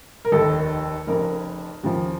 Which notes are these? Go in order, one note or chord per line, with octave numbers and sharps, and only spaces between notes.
A#4
F1 D#2 D#3 A4
F1 F2 C#3 A#4
D#2 C#3 F3